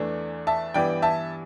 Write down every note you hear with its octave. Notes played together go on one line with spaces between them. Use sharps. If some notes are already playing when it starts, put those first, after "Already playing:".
Already playing: E2 E3 A3 D4
E5 A5
G2 E3 G3 B3 E4 D5 G5
E5 A5